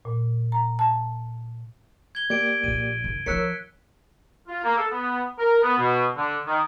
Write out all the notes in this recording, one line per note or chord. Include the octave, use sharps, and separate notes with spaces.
A#2
A#5
A5
G#6 G7
A#3 G4 D5 G#6 D7
A#1 A#2 D#7
F#2 C#3
D#3 F3 A#4 C#5 E6 F#6 B6 C#7
F4
A#3
A4
B3
A#4
B3
B2
D3
D#3